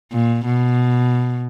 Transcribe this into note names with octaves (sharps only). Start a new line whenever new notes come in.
A#2
B2